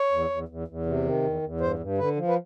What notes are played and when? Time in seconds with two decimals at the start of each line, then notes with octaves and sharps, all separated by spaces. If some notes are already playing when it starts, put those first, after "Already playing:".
Already playing: C#5
0.11 E2
0.30 E2
0.48 E2
0.68 E2
0.86 C3
1.05 D#3
1.23 E2
1.42 E2
1.61 G2 C5
1.79 G2
1.98 D3 B4
2.16 F3
2.28 B4